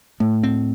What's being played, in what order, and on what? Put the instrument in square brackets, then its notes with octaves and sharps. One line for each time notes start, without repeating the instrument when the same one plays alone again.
[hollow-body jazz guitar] A2 [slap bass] A3
[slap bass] C4